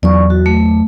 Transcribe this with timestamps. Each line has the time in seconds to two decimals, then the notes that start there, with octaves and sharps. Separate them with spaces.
0.03 E2 F#3 D5 C#6
0.30 F#4
0.46 A3